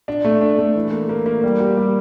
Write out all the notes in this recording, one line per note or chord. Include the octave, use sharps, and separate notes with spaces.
D4
A3
D4
A3
E3
A#3
A#3
A#3
G3
G4
G3